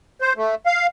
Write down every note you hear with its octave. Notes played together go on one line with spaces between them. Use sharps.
C5
A3
F5